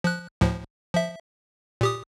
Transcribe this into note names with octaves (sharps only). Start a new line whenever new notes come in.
F3 F#6
D2 A2 F3
F3 E5
A#2 G4 D#6